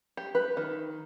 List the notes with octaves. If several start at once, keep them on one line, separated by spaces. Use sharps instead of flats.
G4
B4
D#3